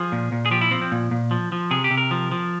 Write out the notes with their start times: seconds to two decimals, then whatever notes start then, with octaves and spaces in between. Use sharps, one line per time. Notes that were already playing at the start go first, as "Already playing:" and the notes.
Already playing: F3 G#4
0.12 A#2
0.32 A#2
0.46 G#4
0.51 F3 G4
0.61 E4
0.71 F3 C4
0.82 C4
0.92 A#2
1.11 A#2
1.31 F3
1.52 F3
1.71 C3 G#4
1.84 G4
1.91 C3
1.97 A#4
2.11 F3
2.31 F3